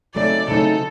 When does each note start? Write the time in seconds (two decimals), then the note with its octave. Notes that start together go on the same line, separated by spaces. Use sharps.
0.15 C#3 F#3 A3 C4 D#4 D5
0.49 C#3 F#3 A3 C4 D#4 A4